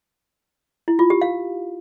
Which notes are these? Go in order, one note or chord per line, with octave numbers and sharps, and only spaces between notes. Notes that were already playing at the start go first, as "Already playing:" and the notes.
E4
F4
G4
F5